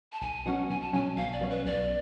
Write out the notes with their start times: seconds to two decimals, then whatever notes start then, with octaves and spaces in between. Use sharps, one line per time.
0.13 A5
0.21 B1 G#5
0.46 B2 F#3 C#4 F#5
0.69 B1 G#5
0.82 A5
0.93 B2 F#3 C#4 G#5
1.17 B1 F5
1.33 D5
1.41 B2 F#3 C#4
1.50 B4
1.65 B1 D5